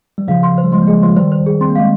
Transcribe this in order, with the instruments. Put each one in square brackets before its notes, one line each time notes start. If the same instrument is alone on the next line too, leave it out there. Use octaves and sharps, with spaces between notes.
[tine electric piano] G3
[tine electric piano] C#3 F3 [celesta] F5
[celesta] C6
C5
[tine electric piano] G3
[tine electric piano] F3 G#3 [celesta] C6
[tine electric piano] A#3
[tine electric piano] F3 G#3 [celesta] G#4
[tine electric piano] C#3 F3 [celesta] C6
[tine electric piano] D#3 G3 [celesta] C5
[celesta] C5
G#4
[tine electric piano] C4 [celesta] C6
[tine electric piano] A#3
[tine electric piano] G#3 [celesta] F5